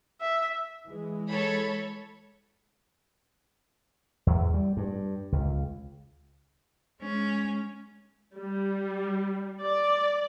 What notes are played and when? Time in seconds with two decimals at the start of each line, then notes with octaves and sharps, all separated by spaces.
0.21 E5
0.85 E3 G#3
1.28 A4 C#5 B5
4.27 E2
4.54 G3
4.77 G2
5.32 C#2
7.01 G#3 C#4
8.37 G3
9.63 D5